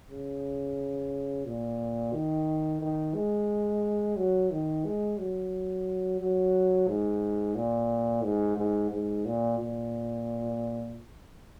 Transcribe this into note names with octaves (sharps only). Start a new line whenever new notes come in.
C#3
A#2
D#3
D#3
G#3
F#3
D#3
G#3
F#3
F#3
G#2
A#2
G#2
G#2
G#2
A#2
A#2